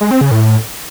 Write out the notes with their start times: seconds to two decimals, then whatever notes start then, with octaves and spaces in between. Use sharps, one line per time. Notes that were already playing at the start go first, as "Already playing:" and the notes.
0.01 G#3
0.11 C4
0.21 C#3
0.31 A2